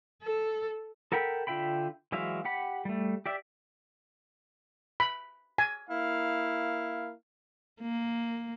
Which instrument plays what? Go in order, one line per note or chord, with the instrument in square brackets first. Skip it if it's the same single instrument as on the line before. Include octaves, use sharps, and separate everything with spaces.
[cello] A4
[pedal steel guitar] A4 A#4 F#5 G5 B5
D3 F4 E5 G5 B5
E3 F#3 G#3 E5 F5
G4 F#5 B5
G3 A3
G4 D5 E5
[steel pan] B5
G#5
[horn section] A#3 E4 F5
[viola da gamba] A#3